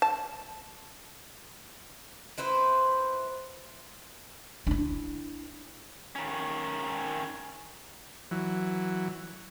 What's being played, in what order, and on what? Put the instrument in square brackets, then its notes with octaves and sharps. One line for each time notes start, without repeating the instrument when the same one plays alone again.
[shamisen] A5
[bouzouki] C4 E4 B4 C5
[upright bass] D4 E4
[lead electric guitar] D#3 C#4
[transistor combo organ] E3 F#3